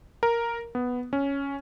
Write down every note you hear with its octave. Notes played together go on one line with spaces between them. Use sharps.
A#4
B3
C#4